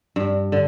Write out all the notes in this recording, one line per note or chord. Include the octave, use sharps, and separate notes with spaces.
G2
D3